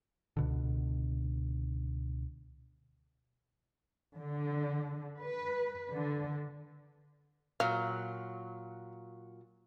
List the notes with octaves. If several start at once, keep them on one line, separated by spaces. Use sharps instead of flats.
C#2 B2 D3
D3
B4
D3
A#2 F#3 F5